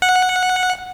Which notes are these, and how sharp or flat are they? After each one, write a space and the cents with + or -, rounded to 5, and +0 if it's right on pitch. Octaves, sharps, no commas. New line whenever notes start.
F#5 -10